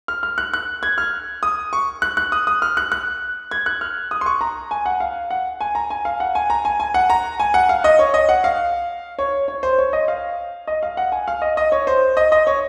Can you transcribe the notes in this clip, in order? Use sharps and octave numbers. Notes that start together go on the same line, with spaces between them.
F6
F6
F#6
F#6
G#6
F6
D#6
C#6
F#6
F#6
D#6
D#6
F6
F#6
F#6
G#6
F#6
F6
D#6
C6
C#6
A#5
G#5
F#5
F5
F#5
G#5
A#5
G#5
F5
F#5
G#5
A#5
G#5
G#5
F#5
A#5
G#5
F#5
F5
D#5
C#5
D#5
F#5
F5
C#5
C#5
C5
C#5
D#5
F5
D#5
F5
F#5
G#5
F5
D#5
D#5
C#5
C5
D#5
D#5
C#5